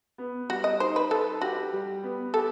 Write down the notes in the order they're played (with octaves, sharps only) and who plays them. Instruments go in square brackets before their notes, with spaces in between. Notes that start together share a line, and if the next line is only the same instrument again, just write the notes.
[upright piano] B3
[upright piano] G3 [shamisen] F#4
[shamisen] D#5
[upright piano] D#4 [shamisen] C5
[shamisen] B4
[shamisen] A4 [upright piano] B4
[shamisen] F#4 [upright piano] G4
[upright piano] G3
B3
[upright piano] G4 [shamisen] A4